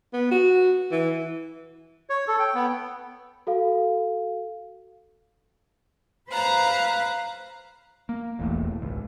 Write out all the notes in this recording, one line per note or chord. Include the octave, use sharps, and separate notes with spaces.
B3
F#4
E3
C#5
A4
G5
B3
F#4 A4 F5
B4 C5 F5 A#5 F#6
A#3
E1 A1 E2 A2
G#1 C#2